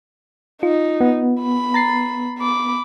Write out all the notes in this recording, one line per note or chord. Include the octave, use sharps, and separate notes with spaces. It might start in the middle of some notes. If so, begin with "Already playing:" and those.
D#4 F4
B3
B5
A#5 A6 C7
B5 D6